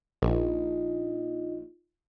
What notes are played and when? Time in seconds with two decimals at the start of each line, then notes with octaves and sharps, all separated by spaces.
0.22 A#1 D#4 F4 D#5